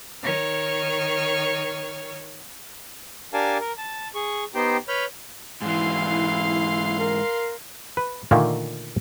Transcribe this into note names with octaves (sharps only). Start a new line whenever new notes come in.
D#3 C#5 F6
D4 G4 A#4 F5 G#5 A5
A#4
A5
G#4 C#6
B3 D#4 G4 C5 G5
B4 C#5 B5 F6 G6
G#2 E3 E4 F5 C6
A#4
B4
A#2 D3 D#3 A3 A#3